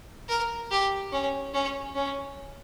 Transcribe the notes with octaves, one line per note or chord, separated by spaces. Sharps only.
A#4
G4
C#4
C#4
C#4